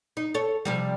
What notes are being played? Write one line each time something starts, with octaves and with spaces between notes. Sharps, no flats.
D#4
A4 C#5
C3 F3 G3